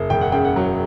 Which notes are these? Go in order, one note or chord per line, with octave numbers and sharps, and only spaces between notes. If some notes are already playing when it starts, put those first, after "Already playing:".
Already playing: F#1
E1 G5
F#5
C#3 G5
F#5
F#3